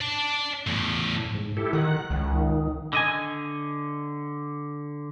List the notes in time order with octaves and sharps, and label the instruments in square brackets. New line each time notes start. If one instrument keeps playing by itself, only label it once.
[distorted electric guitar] D5 A5
E2 A2
[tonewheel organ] G#2
E4 G4 A4
[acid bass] D#3 [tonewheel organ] F#5
[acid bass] C#2
[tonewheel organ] D#3
[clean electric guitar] D3 D#5 G#5